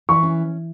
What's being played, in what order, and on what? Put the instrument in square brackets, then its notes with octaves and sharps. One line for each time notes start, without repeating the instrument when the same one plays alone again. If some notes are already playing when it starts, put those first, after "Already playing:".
[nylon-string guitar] E3 [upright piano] C#6
[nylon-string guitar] C#4